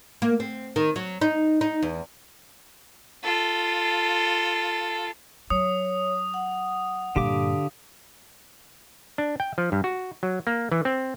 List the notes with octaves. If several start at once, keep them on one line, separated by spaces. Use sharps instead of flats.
A#3
C4
D#3
F#3
D#4
D#4
E2
F4 A4
F#3 C#5 D#6
F#5
G2 A#2 D3 G4 F5 D6
D4
G5
F3
G2
F#4
F#3
A#3
E3
C4